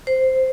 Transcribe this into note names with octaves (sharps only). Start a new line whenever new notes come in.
C5